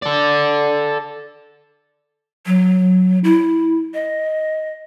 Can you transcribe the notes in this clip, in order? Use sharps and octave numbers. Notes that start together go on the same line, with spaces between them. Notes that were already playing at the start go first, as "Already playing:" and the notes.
A4 D5
F#3
E4
D#5